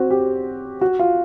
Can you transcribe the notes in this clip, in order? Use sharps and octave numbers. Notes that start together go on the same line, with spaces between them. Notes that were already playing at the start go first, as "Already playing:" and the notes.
Already playing: C4 F#4
G4
F#4
F4